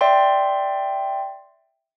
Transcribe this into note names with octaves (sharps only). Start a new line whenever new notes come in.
D5 E5 G5 C6